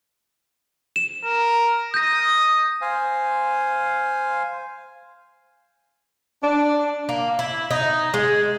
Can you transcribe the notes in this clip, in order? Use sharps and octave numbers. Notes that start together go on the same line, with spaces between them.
E7
A#4
D#6 G6 A#6
C5 F5 G#5
D4
A#3
E4
D#4
G#3